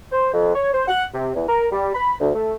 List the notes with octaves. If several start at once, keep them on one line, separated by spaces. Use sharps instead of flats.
C5
F2
C#5
C5
F#5
C3
E2
A#4
G3
B5
D2
A3